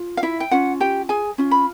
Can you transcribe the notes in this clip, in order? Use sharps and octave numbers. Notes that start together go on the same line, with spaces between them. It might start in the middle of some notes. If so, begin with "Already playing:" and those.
Already playing: F4
F5
E4 E5
G5
C#4 F4 F#5
G4 G5
G#4 G#5
C#4 F4
B5